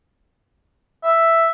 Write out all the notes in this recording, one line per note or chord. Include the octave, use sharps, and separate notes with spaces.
E5